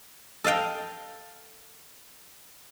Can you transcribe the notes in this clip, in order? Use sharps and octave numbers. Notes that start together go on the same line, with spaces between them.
A4 D#5 F5 G5